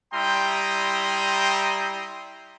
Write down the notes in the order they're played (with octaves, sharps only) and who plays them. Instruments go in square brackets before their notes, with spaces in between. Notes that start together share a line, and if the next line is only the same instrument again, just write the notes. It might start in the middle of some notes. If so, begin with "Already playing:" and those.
[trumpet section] G3 E4 G5 A#5 C6 D#6